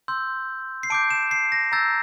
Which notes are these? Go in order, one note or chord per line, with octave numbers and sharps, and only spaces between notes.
C6 E6 G6
C7
A5 D6 G6 D7
E7
C7
A#6
A#5 E6 G6 A6